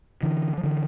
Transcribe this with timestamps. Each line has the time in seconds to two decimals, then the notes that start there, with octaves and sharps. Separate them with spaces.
0.23 D3 E3
0.58 F3
0.63 D3 E3